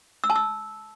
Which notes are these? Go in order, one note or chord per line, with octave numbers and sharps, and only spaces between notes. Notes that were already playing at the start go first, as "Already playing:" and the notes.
E6
A5
E6